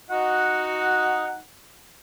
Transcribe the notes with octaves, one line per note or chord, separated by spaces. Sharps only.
D#4 F#4 F#5